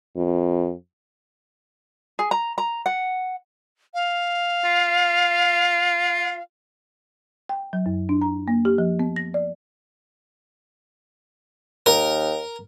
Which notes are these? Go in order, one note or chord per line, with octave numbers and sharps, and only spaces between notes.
F2
G#4
A#5
A#5
F#5
F5
F4
G5
F#3
F#2
D4
A#5
A#3
G4
F3
B3
A#6
D5
D#2 A#4